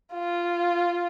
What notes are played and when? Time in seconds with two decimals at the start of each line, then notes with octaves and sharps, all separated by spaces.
0.14 F4